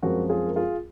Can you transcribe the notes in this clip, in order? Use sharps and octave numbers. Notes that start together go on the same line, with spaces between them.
F#2 F3 G#3 C4 F#4 A#4
F4 G#4
A#4
F4 G#4